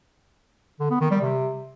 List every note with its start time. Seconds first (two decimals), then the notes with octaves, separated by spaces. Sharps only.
0.80 D3
0.90 B3
1.01 D#3
1.11 G3
1.21 C3